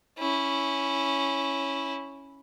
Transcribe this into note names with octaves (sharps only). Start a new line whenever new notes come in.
C#4 E4